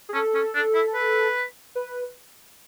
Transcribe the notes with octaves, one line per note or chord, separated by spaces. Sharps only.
G#4
C#4 A4
C#4
D4
E4
B4
B4